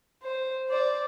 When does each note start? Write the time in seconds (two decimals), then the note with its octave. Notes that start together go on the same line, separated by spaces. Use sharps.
0.22 C5
0.70 C5 D5